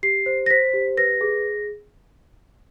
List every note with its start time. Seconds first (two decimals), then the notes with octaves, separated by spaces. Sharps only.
0.03 G4 C7
0.26 C5
0.46 A#6
0.50 C5 B6
0.74 G4
0.97 B4 A#6
1.21 G#4